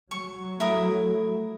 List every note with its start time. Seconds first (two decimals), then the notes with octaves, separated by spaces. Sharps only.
0.11 F#3 C#6
0.60 A3 E4 A#4 D#6